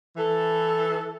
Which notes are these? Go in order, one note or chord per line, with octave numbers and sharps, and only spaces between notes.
E3 A4